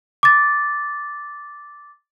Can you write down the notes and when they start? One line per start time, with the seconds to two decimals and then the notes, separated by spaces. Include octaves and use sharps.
0.23 D6 A6